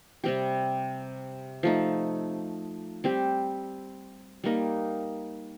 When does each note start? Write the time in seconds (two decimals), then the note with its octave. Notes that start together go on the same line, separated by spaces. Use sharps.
0.24 C3 G3 C4 G4
1.63 F3 A3 D#4
3.04 G3 C4 G4
4.44 G3 A#3 D#4